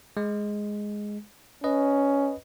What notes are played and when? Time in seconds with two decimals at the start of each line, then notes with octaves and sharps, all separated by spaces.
0.17 G#3
1.64 C#4 B4 D#5